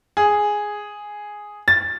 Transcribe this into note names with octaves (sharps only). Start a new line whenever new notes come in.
G#4
A6